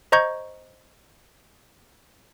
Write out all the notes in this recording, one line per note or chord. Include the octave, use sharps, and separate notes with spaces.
C5 D#5 A#5 C#6 G6 G#6